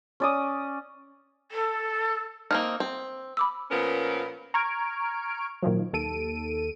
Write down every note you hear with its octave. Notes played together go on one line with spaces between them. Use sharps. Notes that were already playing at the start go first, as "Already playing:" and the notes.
C#4 D5 D#6
A4
A#3 C4 D#4 F6
C4
B5 D6 E6
A#2 F3 B3 C#4 A#4
A#5 C#6 F6 G#6 D7
A#2 D#3 F3 F#3
D#2 A4 D7 D#7